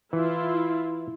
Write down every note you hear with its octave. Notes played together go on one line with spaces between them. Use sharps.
E3 E4 F4